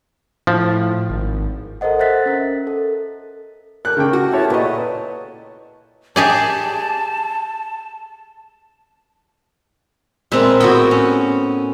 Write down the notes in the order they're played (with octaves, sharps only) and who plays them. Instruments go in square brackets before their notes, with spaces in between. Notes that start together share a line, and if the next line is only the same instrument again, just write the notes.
[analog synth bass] A2 [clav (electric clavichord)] F3
[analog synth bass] G#1
[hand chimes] A4 A#4 C5 D#5 F#5
C5 E5 F#5 F#6 A6 B6
C#4 A#4
A4
[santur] A4 D5 G5 [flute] A#4 [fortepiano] F#6
[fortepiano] C#3 G5 [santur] G3 A3 G4
[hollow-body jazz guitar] F#4
[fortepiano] E4 C#5 E5 [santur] G4 [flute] A5
[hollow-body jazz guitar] A#2 D#5 [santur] F#3 F#4 [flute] B4
[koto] G4 G#4 D5 [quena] A5
[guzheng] A#2 B4 E5 [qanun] G#3 C4
[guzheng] A2 B3 [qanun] F#4 G5
[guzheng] C#4